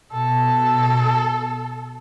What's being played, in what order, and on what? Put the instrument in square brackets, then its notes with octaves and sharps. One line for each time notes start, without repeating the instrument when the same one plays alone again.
[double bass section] B2 [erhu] A4